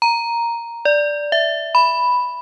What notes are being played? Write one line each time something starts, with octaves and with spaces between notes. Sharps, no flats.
A#5
D5
E5
B5